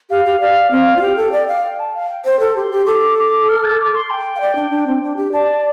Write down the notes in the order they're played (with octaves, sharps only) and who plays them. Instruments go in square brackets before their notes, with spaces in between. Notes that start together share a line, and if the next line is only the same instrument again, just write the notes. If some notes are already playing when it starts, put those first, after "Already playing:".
[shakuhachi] G4 [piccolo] F5
[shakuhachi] G4
[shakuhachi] D5 [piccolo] F5
[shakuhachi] C4 [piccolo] F5
[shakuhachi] F4
[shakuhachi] G4 [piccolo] G5
[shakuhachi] A4
D5
F5
[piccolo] G5
A5
F5
G5
[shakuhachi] C5 [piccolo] G5
[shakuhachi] A4
[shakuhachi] G4 [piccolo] C6
[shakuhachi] G4
[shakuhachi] A4 [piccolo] D6
[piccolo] D6
F6
A6
D6
C6
G5
[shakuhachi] F5
D5
D4
D4
C4
D4
G4
[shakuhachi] D5 [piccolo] A5